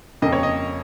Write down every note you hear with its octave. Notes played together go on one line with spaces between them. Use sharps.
F2 C#3 A#3 D#5
C#5
D#5